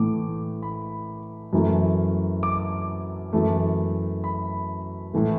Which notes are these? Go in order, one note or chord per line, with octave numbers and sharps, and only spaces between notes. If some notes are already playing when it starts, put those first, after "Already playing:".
Already playing: A2 E3 A3 D6
B5
F#2 E3 A3
D6
F#2 E3 A3
B5
A2 E3 A3